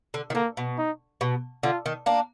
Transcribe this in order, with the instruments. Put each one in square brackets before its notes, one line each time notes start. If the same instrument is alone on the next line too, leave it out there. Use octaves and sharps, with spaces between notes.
[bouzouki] D3
D#3
[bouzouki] D3 [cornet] A#3
[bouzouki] B2
[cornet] D#4
[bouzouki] B2
[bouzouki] D3 [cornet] F4
[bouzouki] D#3
A#3 D4